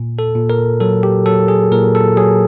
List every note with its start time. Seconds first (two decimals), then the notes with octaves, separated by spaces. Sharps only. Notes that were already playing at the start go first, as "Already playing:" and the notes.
Already playing: A#2
0.19 A4
0.35 A#2
0.50 A#4
0.80 F#3 A4
1.03 G4
1.26 F#3 A4
1.48 G#4
1.72 A#2 A#4
1.95 A4
2.17 F#3 G#4